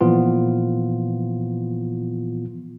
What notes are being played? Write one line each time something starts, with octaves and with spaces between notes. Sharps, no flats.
A#2 E3 F3 B3 F4